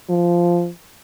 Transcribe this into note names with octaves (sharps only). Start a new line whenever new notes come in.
F3